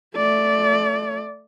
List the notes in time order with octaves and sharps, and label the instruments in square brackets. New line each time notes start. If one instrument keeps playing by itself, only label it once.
[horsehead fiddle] A3 D5